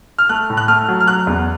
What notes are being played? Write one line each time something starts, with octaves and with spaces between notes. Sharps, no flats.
F6
A3 F#6
A2
F#6
A3 F6
F#3
F6
F#3 F#6
E2